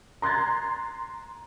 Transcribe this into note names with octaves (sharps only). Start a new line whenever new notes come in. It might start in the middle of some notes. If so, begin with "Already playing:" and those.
A#5 C6 F#6 G#6 A6